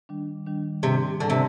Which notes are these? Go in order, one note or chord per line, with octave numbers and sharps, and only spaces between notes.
D#3 G3 D4
D#3 G3 D4
G#2 C3 G3 D4
G#2 D3 G3 D4
C3